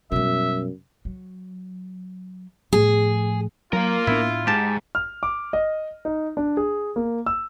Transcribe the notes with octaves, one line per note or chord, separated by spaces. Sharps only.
F#2 B2 G3 E5
F#3
A2 F3 G#4
F#3 A#3 F4 A#4
A2 B3 D4 E4
G#2 G4 A5
F6
D6
D#5
D#4
D4
G#4
A#3
E6